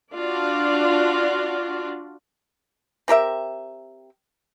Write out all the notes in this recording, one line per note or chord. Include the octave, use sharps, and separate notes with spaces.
D4 F4 F#4 D5
C4 G4 A#4 E5